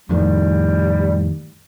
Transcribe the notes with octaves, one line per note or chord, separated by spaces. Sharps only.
F2 A2 D#3 G3